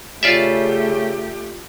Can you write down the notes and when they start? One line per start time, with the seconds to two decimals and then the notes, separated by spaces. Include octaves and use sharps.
0.23 C#3 A3 F4 G4 D5 E5